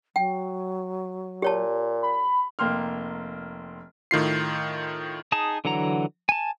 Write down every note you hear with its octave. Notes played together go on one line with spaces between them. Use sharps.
F#3 G5
A#2 G4 C#5 A5
B5
F1 A#3 G5 C6 F6
A2 D#3 F4 C7
D#4 G#4 A5
D3 E3 F#3 F#5 A#5
G#5 A5